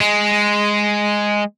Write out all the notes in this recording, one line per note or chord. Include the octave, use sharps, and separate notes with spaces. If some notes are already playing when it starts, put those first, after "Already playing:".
G#3